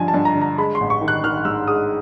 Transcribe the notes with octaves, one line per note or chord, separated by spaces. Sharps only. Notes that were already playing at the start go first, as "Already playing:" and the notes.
Already playing: G2 D3 F3 G#5
A5
G2
A#5
D3
A#5
G#3 B5
C6
A1
C#6
D#3
F#6
D#3 F6
G#2 E6
G#3 D#6